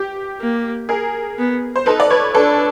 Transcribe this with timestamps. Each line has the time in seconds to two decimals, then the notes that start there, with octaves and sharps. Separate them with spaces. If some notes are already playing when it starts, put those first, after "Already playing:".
Already playing: G4
0.41 A#3
0.89 G#4 A#4
1.38 B3
1.76 C5
1.86 D#4 A4 B4
2.00 D5
2.10 B4 C#5
2.34 D4 A4 B4